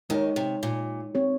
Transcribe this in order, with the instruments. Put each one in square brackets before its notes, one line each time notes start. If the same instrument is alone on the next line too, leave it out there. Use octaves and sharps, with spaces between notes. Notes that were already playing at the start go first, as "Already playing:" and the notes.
[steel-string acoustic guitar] D#2 D#3 [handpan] G#3 D#4 G4 C#5
[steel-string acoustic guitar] C3
A#2
[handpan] C4 G4 C#5